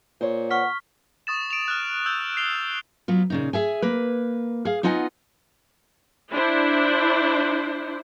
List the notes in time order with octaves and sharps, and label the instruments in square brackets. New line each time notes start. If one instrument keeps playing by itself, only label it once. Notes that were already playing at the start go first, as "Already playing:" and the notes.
[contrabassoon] A#2 [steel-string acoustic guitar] C5 C#5
[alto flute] F#5 [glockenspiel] C#6 F6 B6
[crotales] C#6 D#6 A6 E7
D7 E7 F7
F6 F#6
E6 G6
C7 F7 G7
[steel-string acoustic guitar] F#3 B3 F4
A#2 C#3 D#4
G#4 E5 G#5
A#3 B4
G#4 F5
B3 D#4 F4 D#5 F#5 G#5
[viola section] D4 E4 C5